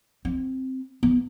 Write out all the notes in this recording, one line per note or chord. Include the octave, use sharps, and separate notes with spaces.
C4
B3